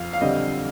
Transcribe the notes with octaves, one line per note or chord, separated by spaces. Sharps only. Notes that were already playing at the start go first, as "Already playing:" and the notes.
Already playing: F2 F5
F5
D3 G3 C4 D#5